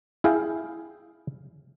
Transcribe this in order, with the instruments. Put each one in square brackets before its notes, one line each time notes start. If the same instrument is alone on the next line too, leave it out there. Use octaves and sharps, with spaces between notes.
[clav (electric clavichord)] E4 G#4 F5 G5